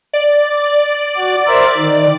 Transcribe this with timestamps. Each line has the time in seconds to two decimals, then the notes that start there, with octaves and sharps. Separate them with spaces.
0.13 D5
1.17 F#4
1.47 A#4 C5 E5
1.77 D#3